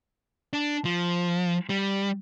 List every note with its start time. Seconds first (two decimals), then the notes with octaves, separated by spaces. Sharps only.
0.53 D4
0.85 F3
1.69 G3